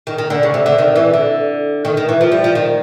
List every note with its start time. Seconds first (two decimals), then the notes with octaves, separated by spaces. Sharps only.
0.07 D#3
0.18 D#3
0.30 D3
0.43 C#3
0.54 C3
0.66 D3
0.78 D#3
0.96 E3
1.13 D3
1.85 D#3
1.97 D#3
2.09 E3
2.21 F3
2.32 G3
2.44 F3
2.55 D#3